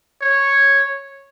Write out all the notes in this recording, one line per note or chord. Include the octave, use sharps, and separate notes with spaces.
C#5